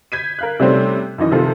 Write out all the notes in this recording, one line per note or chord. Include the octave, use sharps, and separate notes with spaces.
G6 G#6 B6 D#7
A#4 F5 F#6
C3 G3 A3 C4 C#4 D#4
F#2 D#3 E3 D#5
C3 D#3 F3 F4 A4